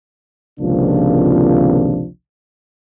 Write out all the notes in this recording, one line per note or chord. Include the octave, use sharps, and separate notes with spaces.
G#1 C#2 C3 F3 A#3 D4